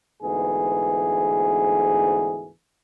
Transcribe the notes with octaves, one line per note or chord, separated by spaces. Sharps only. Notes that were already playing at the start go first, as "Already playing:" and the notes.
D2 G#2 E3 B3 G#4